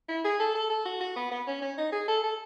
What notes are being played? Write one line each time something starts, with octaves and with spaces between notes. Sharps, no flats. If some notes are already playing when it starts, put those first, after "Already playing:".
E4
G#4
A4
A4
A4
F#4
F#4
B3
B3
C#4
C#4
D#4
G#4
A4
A4